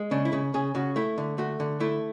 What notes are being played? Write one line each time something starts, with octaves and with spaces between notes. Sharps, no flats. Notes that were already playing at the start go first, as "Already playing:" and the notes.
Already playing: G#3
C#3 D4
E4
C#3
C#3 G#4
C#3 F#4
A3 E4
D3
A3 F#4
D3
A3 E4